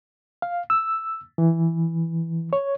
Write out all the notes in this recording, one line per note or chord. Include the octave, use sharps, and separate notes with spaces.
F5
E6
E3
C#5